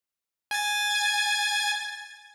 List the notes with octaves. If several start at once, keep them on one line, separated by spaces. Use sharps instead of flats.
G#5 G#6 A6